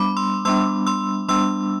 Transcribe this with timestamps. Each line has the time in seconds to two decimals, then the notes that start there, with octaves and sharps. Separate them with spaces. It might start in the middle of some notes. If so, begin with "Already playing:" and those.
Already playing: G3 B3 D4 B5 D6
0.17 C6 E6
0.45 G3 B3 D4 C6 E6
0.87 C6 E6
1.28 G3 B3 D4 C6 E6